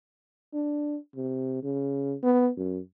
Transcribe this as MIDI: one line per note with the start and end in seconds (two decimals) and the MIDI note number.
0.53 0.97 62
1.16 1.63 48
1.63 2.16 49
2.23 2.50 59
2.57 2.79 42